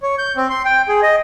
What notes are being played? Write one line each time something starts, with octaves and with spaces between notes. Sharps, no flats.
C#5
G6
C4
C6
G5
G#4
D#5